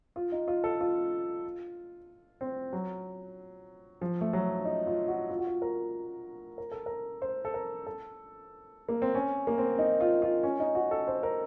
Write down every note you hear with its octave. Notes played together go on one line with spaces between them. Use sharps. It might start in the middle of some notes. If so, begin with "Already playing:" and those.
F4
D#4
F4
A4
F4
C4
F#3
F3
A3
F#3
D#4
F4
F#4
F4
F#4
F4
A#4
A#4
A4
A#4
C5
A4
A#4
A4
A#3
C4
C#4
A#3
C4
D#4
F4
F4
C#4
D#4
F#4
A4
C5
A#4